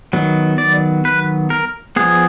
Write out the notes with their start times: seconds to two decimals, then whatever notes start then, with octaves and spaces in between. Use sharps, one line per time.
0.13 D#3 F#3 B3
0.58 D5
1.05 B4
1.50 A#4
1.96 F3 B3 G#4